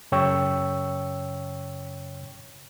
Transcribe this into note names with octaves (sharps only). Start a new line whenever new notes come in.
F#2 C#3 C#5 G5 C#6 E6